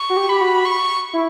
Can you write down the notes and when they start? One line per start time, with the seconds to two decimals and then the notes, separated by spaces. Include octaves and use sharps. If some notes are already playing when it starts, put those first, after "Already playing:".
Already playing: C#6
0.10 F#4
0.17 G4
0.29 G4 B5
0.41 F#4
0.65 C#6
1.13 E4